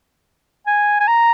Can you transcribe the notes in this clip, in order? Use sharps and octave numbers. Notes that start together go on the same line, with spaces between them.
G#5
G#5
A#5